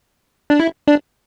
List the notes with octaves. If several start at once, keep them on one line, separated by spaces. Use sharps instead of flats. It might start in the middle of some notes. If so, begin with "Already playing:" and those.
D4
E4
D4